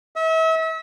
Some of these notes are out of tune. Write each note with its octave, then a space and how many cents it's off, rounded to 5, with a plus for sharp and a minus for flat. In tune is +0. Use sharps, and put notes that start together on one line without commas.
E5 -35